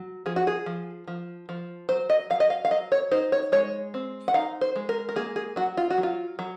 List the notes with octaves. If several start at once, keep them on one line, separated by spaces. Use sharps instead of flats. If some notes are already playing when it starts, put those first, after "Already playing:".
Already playing: F#3
F3 G#4
F#4
G#4
F3
F3
F3
F#3 C5
D#5
F#3 F5
D#5
F5
F5
F#3 D#5
C#5
D#4 C5
C#5
G#3 C#5
C4
F#5
D#4 F5
C5
G#3
A#4
A#4
A#3 G#4
G#4
F#3 F#4
F4
F#4
F#3
F4
F#3